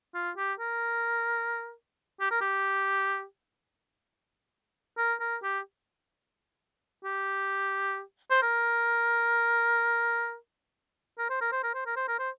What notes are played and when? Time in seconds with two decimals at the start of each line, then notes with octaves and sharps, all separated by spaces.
0.15 F4
0.37 G4
0.60 A#4
2.21 G4
2.31 A#4
2.41 G4
4.98 A#4
5.20 A#4
5.43 G4
7.04 G4
8.31 C5
8.42 A#4
11.19 A#4
11.30 C5
11.41 A#4
11.52 C5
11.64 A#4
11.75 C5
11.86 A#4
11.97 C5
12.08 A#4
12.19 C5